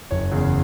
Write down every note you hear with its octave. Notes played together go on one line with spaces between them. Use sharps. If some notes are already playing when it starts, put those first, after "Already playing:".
F#1 C#5
E2 C#3